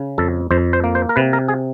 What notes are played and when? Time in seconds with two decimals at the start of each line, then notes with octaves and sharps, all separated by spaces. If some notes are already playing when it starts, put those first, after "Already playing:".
Already playing: C#3
0.18 F2 A4
0.51 F2 C5
0.73 C5
0.84 A#3
0.95 C5
1.09 A#4
1.16 C3 B4
1.33 A#4
1.48 G#4